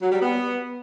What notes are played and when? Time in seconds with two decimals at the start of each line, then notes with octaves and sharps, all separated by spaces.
0.01 F#3
0.11 G3
0.21 B3